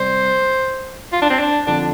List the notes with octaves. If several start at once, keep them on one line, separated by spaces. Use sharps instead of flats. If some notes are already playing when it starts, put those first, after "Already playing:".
Already playing: C3 G3 C4 C5
F4
D4
C4
D4
F2 D3 D4